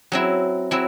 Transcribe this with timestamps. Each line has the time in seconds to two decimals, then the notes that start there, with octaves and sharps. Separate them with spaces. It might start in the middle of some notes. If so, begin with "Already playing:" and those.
0.12 F#3 C4 E4
0.71 F#3 C4 E4